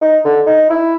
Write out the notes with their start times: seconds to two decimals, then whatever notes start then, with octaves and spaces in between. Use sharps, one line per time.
0.01 D#4
0.24 D3
0.46 D#4
0.70 E4